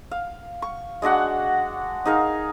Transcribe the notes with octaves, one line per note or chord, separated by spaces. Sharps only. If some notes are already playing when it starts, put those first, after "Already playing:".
F5
C#6
G#3 D4 F#4 F#5
D#4 G#4 A#4 F5